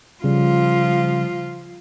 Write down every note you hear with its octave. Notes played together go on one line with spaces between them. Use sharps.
C#3 F3 G3 F4